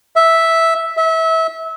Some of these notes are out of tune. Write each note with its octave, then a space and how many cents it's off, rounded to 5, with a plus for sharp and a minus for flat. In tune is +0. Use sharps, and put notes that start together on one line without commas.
E5 -5
E5 -25